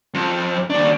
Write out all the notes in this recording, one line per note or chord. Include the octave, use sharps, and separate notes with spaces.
F2
D#2 D4